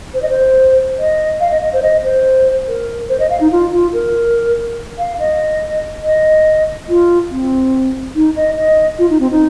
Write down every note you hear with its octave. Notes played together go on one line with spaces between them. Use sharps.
C5
D#5
C5
D#5
F5
D#5
D#5
C5
D#5
C5
A#4
C5
D#5
F5
D#4
F4
F4
A#4
F5
D#5
D#5
F4
C4
D#4
D#5
D#5
F4
D#4
C4
D#4